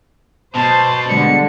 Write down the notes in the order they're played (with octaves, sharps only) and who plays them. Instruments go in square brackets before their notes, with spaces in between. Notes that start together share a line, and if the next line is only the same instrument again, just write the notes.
[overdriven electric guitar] B2 [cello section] C5 [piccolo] A5
[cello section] D3 G3 G#3 [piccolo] C#7